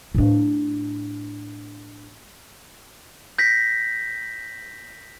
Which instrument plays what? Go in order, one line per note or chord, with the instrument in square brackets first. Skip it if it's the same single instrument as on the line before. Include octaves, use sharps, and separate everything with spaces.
[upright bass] A2 D4
[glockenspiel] G6 A#6 B6